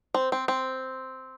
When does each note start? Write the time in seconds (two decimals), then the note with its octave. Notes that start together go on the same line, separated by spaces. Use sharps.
0.14 C4
0.32 C4
0.48 C4